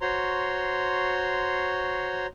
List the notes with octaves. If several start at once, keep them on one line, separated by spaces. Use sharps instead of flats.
F#4 C5 C#5 A#5 C6